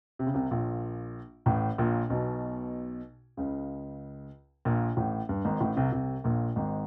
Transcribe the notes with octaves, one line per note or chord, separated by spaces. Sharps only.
C3
C#3
C2 C3
A#1 A#2
A1 A2
A#1 A#2
B1 B2
C#2 C#3
A#1 A#2
A1 A2
G2
G#1 G#2
A1 A2
C2 C3
C2 C3
A#1 A#2
G#1 G#2